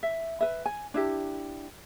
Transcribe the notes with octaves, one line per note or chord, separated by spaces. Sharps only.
E5
B4 E5
G#5
D4 E4 G4